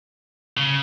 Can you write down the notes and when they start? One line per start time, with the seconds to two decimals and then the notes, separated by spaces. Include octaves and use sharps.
0.57 C#3